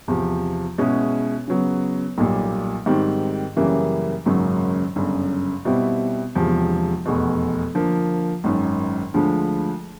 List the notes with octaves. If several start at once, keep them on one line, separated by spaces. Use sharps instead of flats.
E2 C3 F3
B2 G#3 C#4 E4 G#4
C#3 F#3 B3
B1 A#2 G3
G#2 D#3 G3 C4
F#2 C#3 E3 G3 A#3
G#1 F#2 C#3 F#3 A#3
G1 F#2 C#3
B2 G3 C4 E4
E1 E2 C3 F3
F1 E2 B2
D3 F3 A#3
G#1 F#2 D#3
D2 D3 F3 G#3